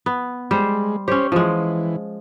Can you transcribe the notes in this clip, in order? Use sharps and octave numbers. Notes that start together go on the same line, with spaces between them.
B3
G3 G#3 C5
C#4 G4 C5 C#5
E3 F3 G#3